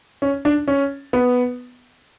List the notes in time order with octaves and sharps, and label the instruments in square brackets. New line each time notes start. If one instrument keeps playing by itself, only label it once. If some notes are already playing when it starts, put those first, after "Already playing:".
[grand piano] C#4
D4
C#4
B3